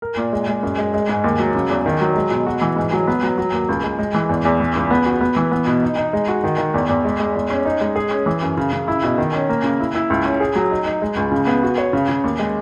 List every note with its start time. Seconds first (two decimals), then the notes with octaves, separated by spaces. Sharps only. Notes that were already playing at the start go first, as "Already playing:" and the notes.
0.02 A#4
0.17 A#2
0.32 G#3
0.48 G#3
0.63 F#2
0.78 G#3
0.94 G#3
1.09 G#2
1.24 D#2
1.39 F#3
1.55 C#3
1.70 E2
1.86 D#3
2.01 F#3
2.16 G#3
2.31 B2
2.47 F#4
2.61 E3
2.76 G#2
2.93 F#3
3.07 B3
3.23 F#3
3.38 F#3
3.53 D#2
3.69 C#2
3.83 G#3
3.99 G#3
4.14 E3
4.29 E2
4.45 E2
4.60 E3
4.76 C#2
4.91 B3
5.06 F#4
5.21 B3
5.36 E3
5.52 B3
5.66 B2
5.83 D#4
5.97 D#4
6.13 G#3
6.28 F#4
6.44 D#3
6.58 D#3
6.74 E2
6.89 E2
7.04 G#3
7.20 G#3
7.35 E2
7.50 C#4
7.65 D#4
7.81 G#3
7.96 G#4
8.11 C#4
8.26 E3
8.42 F#2
8.57 C#3
8.73 C#3
8.88 E4
9.03 B2
9.18 D#3
9.34 C#4
9.49 A#3
9.64 C#3
9.80 E4
9.95 E4
10.10 C#2
10.25 C#4
10.40 G#4
10.56 F#3
10.71 D#4
10.86 D#4
11.02 G#3
11.17 C#2
11.32 C#3
11.47 B3
11.63 F#4
11.78 C#5
11.93 C#3
12.09 C#3
12.24 D#2
12.39 G#3